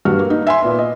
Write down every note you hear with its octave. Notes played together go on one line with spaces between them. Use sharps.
G2 F#4 F6
A#3
D#4
E5 G#5 C6
A#2 B3
D#5